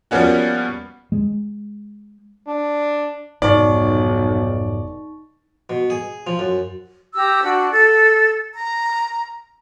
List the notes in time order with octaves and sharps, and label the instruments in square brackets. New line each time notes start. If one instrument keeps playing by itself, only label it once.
[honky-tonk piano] F3 G3 A#3 B3 C#4 F#4
[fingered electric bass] G#3
[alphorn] D4
[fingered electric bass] F1 G#2 G#3 [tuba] B1 [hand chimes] D#4 C#6 [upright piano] D5
[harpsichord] B2
G#4
F3
F#2
[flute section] G4 A#5 E6
D4 F#4
A4
A#5